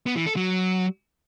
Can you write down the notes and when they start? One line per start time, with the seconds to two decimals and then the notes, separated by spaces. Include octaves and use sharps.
0.06 B3
0.16 E3
0.26 A4
0.36 F#3